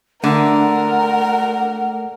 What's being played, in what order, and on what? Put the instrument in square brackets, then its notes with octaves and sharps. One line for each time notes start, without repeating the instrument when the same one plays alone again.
[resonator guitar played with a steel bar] D3 [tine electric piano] A3 [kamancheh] A#4 [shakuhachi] F#5